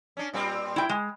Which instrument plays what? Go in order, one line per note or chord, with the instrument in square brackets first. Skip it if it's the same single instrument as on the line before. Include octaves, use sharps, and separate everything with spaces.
[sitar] C#4 D4
A#2 G3 C4
[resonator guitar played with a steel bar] E4 G5
G#3